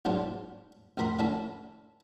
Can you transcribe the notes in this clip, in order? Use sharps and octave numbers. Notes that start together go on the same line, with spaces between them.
B1 G#2 D4 F4 C#5
A1 F2 A#4 B5 C6
D3 A3 C#4 E4 A4